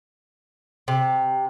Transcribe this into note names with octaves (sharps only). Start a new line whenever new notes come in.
C3